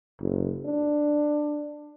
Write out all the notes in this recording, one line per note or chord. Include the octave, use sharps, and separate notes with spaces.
F#1
D4